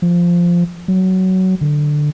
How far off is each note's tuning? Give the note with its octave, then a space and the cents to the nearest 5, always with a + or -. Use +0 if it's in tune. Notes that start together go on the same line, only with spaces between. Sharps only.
F3 -5
F#3 +15
D3 +10